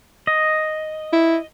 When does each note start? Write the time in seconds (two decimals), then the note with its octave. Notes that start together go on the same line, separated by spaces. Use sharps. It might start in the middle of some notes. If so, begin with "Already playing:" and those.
0.27 D#5
1.13 E4